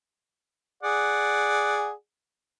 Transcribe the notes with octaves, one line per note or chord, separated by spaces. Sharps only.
G#4 D5 F#5